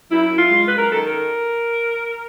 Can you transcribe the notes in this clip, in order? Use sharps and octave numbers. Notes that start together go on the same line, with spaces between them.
F#2 E4
F#2
F4
G#3
B4
F#2
A#4
D#3 A4
A#4